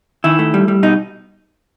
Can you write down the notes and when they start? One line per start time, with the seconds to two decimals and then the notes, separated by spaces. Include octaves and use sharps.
0.24 D#3 E4
0.39 A3
0.54 G3
0.68 G3
0.83 B2 D#4